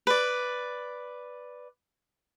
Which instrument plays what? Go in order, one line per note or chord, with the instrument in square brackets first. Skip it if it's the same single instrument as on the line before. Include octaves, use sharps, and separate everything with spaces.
[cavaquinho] B4 D5